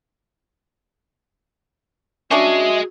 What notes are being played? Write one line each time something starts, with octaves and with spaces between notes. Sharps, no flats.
C#4 D4 F#4 G#4 D#5 E5